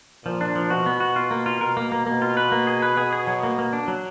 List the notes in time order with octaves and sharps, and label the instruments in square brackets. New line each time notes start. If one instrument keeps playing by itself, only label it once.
[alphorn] A#2 [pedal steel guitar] F3
[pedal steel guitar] D4
F3
[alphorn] B2 [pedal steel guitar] F#4
[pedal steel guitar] B3
F#4
F4
A#3
F4
[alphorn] B2 [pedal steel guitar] A#4
[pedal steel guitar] A#3
A#3
[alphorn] B2 [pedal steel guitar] A#3
[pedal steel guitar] F4
B4
A#3
G#4
B4
[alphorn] B2 [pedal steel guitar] G#4
[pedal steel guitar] G#4
F#3
A#3
A#3
D4
F#3